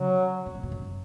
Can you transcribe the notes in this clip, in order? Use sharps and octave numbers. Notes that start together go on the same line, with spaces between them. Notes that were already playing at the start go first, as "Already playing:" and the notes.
Already playing: C#3 F#3
B2
A#2
B2
F#2